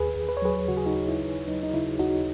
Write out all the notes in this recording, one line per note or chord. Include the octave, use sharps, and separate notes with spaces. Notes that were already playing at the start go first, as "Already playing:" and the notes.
Already playing: D#2 G#4 B4
D#2
B4
C#5
F#3 G#4 B4
C#3 F#4
G#4
D#4 F#4
D#2
E4
D#2
F#3 D#4
D#4
C#3 E4
D#2 D#4 F#4